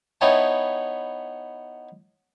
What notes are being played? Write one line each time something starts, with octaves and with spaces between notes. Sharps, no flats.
B3 D#4 E4 C#5 G5 A5